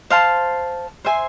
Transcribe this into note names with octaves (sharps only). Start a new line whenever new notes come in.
C5 F5 A5 C6
C5 E5 G#5 C6